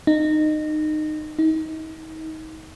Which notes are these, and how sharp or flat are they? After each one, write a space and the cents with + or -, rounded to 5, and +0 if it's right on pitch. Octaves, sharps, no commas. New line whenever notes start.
D#4 -20
D#4 +35